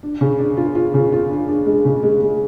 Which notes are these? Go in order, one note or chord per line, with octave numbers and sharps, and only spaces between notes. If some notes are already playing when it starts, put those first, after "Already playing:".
D4
C#3
D4
F4
F4
C#3
F4
D4
D4
G#3
C#3
G#3
G#3